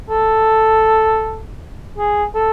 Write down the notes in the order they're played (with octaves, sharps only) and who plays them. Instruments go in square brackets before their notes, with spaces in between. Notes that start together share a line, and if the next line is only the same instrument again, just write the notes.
[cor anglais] A4
G#4
A4